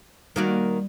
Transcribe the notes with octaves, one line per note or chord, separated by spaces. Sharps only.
D#3 G3 A#3 F#4